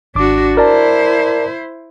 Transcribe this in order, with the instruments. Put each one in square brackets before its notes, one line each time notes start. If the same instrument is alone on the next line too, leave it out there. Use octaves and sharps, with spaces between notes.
[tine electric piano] G#1 D6 [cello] D4 F#4
[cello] E4 C5 [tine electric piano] A#4 D5 A5